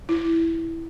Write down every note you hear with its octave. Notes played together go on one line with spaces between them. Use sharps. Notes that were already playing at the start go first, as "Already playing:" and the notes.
E4